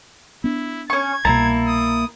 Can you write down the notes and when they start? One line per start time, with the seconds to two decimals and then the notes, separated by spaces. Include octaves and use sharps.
0.44 B3 D4 E4
0.90 C#4 C#6 G#6
1.25 C2 B2 A#3 E4 A5 A#5
1.68 D#6